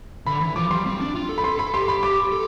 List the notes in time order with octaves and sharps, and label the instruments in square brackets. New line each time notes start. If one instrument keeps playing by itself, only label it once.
[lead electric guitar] D3 [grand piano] B5
[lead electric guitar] E3
[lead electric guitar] F3 [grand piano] D6
[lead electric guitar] G3 [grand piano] C6
[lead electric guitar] C4
D4
F4
A4
[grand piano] B5
[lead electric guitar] A4 [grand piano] C6
[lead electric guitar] A4 [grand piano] B5
[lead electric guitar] G4 [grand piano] C6
[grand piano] B5
D6
[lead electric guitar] A4